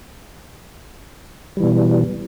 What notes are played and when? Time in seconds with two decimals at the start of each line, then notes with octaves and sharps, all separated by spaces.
1.57 G3
1.60 E3
1.63 B2